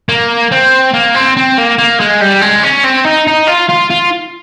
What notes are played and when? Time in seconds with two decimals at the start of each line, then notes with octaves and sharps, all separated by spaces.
0.09 A#3
0.51 C4
0.94 A#3
1.15 C4
1.37 C4
1.58 A#3
1.78 A#3
2.00 G#3
2.21 G3
2.42 G#3
2.64 C#4
2.84 C4
3.05 D#4
3.27 D#4
3.47 F4
3.69 F4
3.90 F4